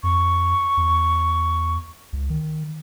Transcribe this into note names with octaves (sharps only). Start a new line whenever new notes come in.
F2 C#6
E2
C#2
D#3